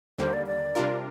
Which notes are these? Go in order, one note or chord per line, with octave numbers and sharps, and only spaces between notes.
D#2 D3 G3 A#3 C5
D5
D5
C3 G3 D4 F4 A#4